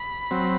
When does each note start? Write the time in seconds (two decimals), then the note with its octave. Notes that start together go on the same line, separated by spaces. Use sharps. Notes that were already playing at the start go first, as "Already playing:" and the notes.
Already playing: B5
0.31 F#3 C4